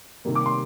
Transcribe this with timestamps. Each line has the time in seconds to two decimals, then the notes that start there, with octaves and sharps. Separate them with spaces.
0.25 C3 D#3 G3 A#3
0.35 D6
0.46 C6